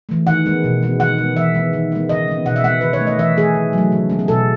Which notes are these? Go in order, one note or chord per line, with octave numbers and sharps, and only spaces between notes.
E3 A3
D#3 F#5
G#3 B3
B2
G#3 B3
D#3 F#5
G#3 B3
E3 E5
G#3 B3
D#3
G#3 B3
C#3 D#5
G#3 B3
B2 F#5
E5
G#3 B3 F#5
D#3 B4
C#5
A3
D#5
E3 E5
A3 G#4
D#3
F#3 A3
C#3
G#3 B3
G#4
B2 A4